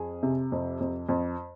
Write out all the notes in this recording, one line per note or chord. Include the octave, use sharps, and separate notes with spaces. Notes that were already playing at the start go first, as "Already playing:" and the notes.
Already playing: F2 G#4
C3
F2
F2
F2